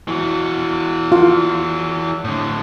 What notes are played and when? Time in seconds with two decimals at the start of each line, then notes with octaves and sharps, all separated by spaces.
0.08 E3 F#4
1.12 F4
2.24 A2 D3